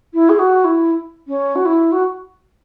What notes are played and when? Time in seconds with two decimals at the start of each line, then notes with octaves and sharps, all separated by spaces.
0.14 E4
0.29 G#4
0.39 F#4
0.65 E4
1.28 C#4
1.56 F#4
1.66 E4
1.92 F#4